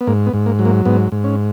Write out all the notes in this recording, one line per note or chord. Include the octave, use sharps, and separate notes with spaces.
B3
G#2 A#3
B3
G#2
A#3
F#3
A#3
G#2 B3
G#2
C#4